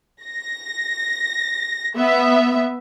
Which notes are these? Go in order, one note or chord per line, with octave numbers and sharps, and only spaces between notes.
A#6
B3 E5